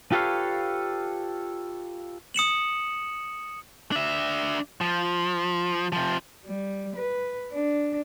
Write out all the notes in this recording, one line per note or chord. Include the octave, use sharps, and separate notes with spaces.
F4 G4 A4 B4 C#5 F5
D#6 C#7 E7 F#7
D4 E5
F3
C3 F3
G3
B4
D4